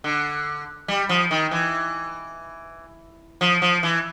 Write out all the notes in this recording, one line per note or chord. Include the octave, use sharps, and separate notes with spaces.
D3
G3
F3
D#3
E3
F3
F3
E3